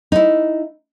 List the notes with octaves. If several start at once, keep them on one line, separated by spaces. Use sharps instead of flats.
D#4 E4